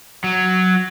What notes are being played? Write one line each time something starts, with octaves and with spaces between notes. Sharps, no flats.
F#3